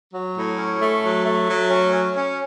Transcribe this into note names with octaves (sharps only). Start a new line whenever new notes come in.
F#3
A2
C#4
A3
F#3
A3
F#3
C#4
C#4
C#4